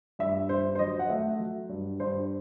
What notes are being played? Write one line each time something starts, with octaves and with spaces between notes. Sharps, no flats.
G2 E5
G2 C5
C5
F#3 D#5
F#5
A3 E5
F#3
G2
G2 C5